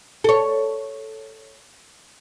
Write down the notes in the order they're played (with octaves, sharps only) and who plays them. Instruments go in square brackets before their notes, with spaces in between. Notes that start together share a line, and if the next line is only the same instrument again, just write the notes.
[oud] A4 C#5